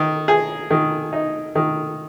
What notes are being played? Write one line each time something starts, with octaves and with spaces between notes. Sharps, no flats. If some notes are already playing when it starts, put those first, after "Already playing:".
Already playing: D#3
G#4
D#3
D#4
D#3